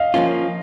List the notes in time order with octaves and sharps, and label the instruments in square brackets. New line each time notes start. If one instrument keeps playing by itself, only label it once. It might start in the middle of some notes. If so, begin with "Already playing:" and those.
Already playing: [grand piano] D#5 F5
[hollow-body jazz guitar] F3 A#3 C#4 F4